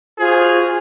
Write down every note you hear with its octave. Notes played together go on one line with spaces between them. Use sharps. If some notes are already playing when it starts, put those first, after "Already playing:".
F4 F#4 G#4 C5